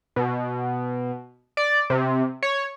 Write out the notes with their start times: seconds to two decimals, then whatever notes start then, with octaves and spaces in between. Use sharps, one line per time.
0.16 B2
1.57 D5
1.90 C3
2.43 C#5